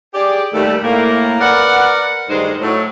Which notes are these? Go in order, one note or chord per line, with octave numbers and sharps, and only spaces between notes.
G4 G#4 D5
D#2 G3 A3
A2 A#3
A#4 B4 D5 F#5
D2 G2 D#3 G#3 D#4 C5
A2 F#3 A3